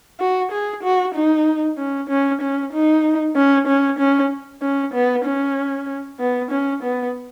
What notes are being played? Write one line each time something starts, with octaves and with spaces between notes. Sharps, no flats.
F#4
G#4
F#4
D#4
C#4
C#4
C#4
D#4
C#4
C#4
C#4
C#4
B3
C#4
B3
C#4
B3